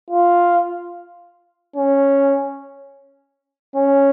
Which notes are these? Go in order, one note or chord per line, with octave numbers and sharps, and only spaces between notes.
F4
C#4
C#4